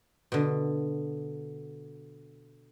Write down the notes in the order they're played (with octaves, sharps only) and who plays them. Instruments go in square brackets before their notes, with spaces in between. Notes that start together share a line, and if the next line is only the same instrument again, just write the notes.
[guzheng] B2 D3